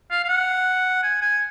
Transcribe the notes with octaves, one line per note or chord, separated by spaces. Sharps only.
F5
F5
F#5
G#5
G#5